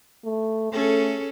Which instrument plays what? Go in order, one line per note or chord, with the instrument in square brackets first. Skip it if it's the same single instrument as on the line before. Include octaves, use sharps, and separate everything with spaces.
[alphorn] A3
[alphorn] A3 [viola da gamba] C#4 G#4 A4